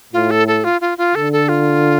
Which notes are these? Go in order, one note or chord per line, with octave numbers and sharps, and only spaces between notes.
A2 F4
A4
A4
F4
F4
F4
D3 A4
A4
F4